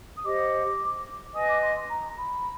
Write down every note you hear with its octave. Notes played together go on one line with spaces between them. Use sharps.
D#6
G4 C5 D#5 F#5 D6
B4 D#5 G#5 D#6
D6
C6
C6
A#5
B5